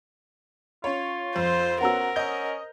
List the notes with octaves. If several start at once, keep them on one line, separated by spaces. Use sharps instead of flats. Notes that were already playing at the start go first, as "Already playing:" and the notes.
C#4 F4 C#5
F2 C5
B3 C#4 F#4 A#4 F#5 A#5 E6
C#4 D#5 G6